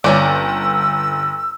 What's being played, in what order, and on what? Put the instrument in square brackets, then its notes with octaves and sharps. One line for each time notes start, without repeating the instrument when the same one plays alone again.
[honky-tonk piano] G1 [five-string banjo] A#3 C#4 D5 [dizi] E6